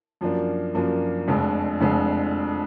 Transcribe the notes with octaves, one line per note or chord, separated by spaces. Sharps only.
F#2 F3 A#3 D4
F#2 F3 A#3 D4
F1 F2 D3 G#3
F1 F2 D3 G#3